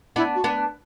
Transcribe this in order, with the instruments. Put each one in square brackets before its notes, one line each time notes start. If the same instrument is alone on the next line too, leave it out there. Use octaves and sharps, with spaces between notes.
[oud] B3 D4 [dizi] E4
[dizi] F#4
[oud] B3 D4